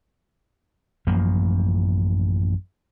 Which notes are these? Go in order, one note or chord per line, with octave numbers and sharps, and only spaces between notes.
A1 F#2 F3 A#3